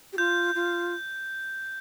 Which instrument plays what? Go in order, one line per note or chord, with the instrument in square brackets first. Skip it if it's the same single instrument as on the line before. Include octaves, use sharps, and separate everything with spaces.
[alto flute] G4
[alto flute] F4 [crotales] G6
[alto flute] F4